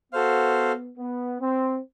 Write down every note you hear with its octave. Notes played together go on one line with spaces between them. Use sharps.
B3 F#4 A4 C5 F5
B3
C4